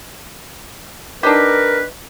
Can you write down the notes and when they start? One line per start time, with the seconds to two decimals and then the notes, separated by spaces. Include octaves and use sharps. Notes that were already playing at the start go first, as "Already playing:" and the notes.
1.23 D4 D#4 G4 A#4 B4